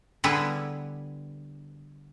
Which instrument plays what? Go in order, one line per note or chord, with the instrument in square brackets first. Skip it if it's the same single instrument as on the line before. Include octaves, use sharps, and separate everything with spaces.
[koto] D3 G3 B3 E4 G#4 B4